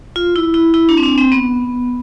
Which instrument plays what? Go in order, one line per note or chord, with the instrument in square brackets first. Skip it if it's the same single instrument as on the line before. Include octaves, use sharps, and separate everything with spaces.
[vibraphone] F4
E4
E4
E4
D4
C4
D4
C4
B3